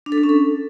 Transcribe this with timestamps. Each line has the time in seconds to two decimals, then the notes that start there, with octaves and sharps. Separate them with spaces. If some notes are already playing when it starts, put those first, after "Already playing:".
0.06 D4
0.12 A4
0.18 D4
0.23 C#4
0.29 A4